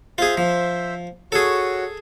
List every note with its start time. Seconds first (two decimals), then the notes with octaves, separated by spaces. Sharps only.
0.18 F4 G#4 C5 E5
0.37 F3
1.32 F#4 G#4 A4 C#5